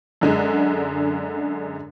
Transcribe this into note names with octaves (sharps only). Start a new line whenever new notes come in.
F#2 D3 G#3